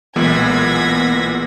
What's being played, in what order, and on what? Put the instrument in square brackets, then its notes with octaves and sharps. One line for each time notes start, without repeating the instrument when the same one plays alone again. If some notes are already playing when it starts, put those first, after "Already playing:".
[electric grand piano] B1 A#2 G#3 [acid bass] E3 [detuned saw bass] B3 [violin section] G#6 A#6 B6